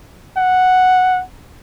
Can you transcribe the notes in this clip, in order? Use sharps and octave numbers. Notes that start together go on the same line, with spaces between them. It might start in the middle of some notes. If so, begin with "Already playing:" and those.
F#5